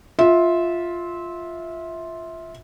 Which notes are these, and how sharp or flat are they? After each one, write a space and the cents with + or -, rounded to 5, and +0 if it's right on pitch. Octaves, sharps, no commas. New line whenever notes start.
F4 +0 E5 -20